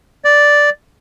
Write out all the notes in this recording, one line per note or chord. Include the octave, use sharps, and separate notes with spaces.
D5